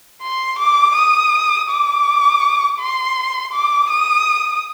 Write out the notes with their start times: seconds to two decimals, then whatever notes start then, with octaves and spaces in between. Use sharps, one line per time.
0.23 C6
0.59 D6
0.96 D#6
1.69 D6
2.80 C6
3.53 D6
3.90 D#6